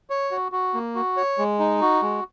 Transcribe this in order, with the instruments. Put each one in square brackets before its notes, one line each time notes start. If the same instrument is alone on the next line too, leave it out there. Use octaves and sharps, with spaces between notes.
[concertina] C#5
F#4
F#4
A#3
F#4
C#5
G#3
D#4
F#4
G#3